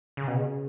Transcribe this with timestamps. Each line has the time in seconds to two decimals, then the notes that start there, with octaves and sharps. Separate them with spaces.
0.17 C#3
0.28 B2
0.37 C#3